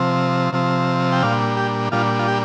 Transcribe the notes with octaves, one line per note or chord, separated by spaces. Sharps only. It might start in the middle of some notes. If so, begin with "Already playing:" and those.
Already playing: C3 F3 C4
C3 F3 C4
G5
A#2 G3 D4 F5
G4
A#2 G3 D4 F4
F4
G4